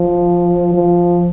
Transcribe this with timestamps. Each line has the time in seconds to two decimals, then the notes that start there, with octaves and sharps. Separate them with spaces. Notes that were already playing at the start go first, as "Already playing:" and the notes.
Already playing: F3
0.74 F3